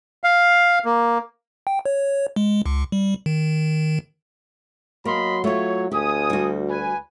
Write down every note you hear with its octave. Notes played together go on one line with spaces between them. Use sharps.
F5
A#3
G5
C#5
G#3
C#2
G3
D#3
F#3 A#3 D#5 B5 C6
A3 F4 C#5
D2 G4 G#5 D#6
G3 F#4
B4 G#5